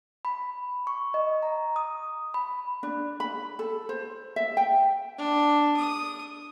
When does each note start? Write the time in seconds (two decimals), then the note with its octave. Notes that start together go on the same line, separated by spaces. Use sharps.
0.25 B5
0.87 C#6
1.14 D#5
1.43 A#5
1.76 D#6
2.34 B5
2.83 D4
3.20 B5
3.59 A4
3.89 C5
4.36 E5
4.57 G5
5.18 D4
5.76 D#6